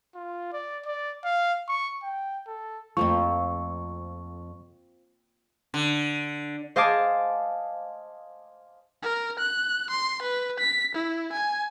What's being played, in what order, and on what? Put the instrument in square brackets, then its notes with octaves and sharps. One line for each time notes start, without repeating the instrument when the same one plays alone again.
[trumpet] F4
D5
D5
F5
C#6
G5
A4
[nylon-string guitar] F2 A3 [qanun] F3 A#3 C4 [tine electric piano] C#6
[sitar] D3
[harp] C5 D#5 F5 G#5 A5 D6
[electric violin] A#4
F#6
C6
B4
B6
E4
G#5